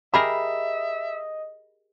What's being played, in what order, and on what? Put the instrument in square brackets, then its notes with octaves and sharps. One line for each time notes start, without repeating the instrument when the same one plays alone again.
[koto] G4 G#4 A#4 [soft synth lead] D#5 [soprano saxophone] E5 [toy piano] B5